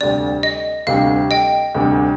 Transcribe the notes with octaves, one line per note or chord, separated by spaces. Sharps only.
D2 C3 G3 D4 D5
D#5
D2 C3 G3 D4 F5
D#5 G5
D2 C3 G3 D4